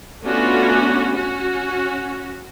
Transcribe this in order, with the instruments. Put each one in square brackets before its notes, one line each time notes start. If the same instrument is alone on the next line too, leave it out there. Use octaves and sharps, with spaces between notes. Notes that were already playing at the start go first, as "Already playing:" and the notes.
[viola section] A3 B3 C#4 D4 F4 F#4
C#4 F#4